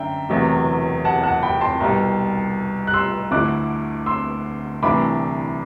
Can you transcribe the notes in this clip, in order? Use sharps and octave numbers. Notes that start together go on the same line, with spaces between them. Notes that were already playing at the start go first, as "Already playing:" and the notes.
Already playing: F#2 D3 D4 E5 G5
E1 E2 C3 F#3 A3
F#5 A5
F#5 A5
G5 B5
A5 C6
C2 B2 G3
F#6
C6 E6
D2 D3 A3 E4 D6 F#6
C6 E6
C2 C3 E3 A3 D4 B5 D6